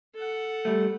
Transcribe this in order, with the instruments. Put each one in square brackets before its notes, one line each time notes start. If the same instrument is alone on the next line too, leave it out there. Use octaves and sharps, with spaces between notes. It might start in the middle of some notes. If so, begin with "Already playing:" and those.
[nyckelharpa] A4 F#5
[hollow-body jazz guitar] G3 A3